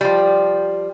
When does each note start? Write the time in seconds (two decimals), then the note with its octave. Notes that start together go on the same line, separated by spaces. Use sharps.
0.01 F3 G3